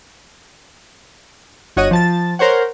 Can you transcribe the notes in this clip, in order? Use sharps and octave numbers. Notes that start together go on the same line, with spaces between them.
G1 F#4 C#5 D#5 F#5 D#7
F3 A5 A6
A#4 C5 C#5 F#5